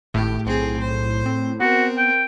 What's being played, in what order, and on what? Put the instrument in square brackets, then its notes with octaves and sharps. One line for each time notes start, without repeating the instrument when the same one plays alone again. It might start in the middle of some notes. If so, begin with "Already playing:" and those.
[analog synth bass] G#1 [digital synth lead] A2 [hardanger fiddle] G4
[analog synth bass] B1 [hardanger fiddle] C4 G#4
[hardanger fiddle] C5
[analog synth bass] C4
[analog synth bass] B3 [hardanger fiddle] C4 A#4 [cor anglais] F#4
[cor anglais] G5